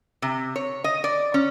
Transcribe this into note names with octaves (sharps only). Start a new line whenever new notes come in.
C3
C#5
D#5
D5
C#4